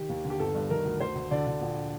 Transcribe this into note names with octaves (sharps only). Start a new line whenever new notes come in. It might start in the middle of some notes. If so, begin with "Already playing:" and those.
Already playing: D#3 G4
D#2
D3
G4
G1 A4
G2
D#3 A#4
D2
D2 C5
D2
D3 D5
D3
A#1